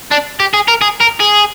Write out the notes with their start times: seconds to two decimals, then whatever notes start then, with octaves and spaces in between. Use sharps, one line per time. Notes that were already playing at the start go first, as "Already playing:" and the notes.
0.11 D4
0.40 G4
0.54 G#4
0.68 A#4
0.82 G#4
1.00 A#4
1.20 G#4